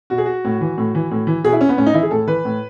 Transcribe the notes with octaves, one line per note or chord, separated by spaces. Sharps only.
B2 F#4
G#4
F#4
A2
E3
A2
E3
A2
E3
B2 G#4
E4
C#4
B3
A2 C#4
D#4
E3 E4
G#4
A2 A4
E3 B4
A2